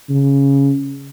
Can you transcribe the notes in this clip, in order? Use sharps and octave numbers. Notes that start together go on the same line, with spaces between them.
C#3